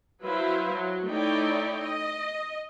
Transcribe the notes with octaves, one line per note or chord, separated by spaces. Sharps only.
F#3 E4 B4 C5 E5 F5
F#3
A3 D#4 E4 C#5 D5 G5
D#5